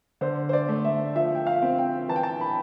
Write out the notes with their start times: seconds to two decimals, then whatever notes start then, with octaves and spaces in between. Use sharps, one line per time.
0.21 D3 C5
0.49 C5
0.53 D5
0.69 A3
0.85 E5
1.16 F3 E5
1.35 G5
1.47 F5
1.62 C4
1.78 G5
2.09 E3 A5
2.16 G5
2.23 A5
2.41 B5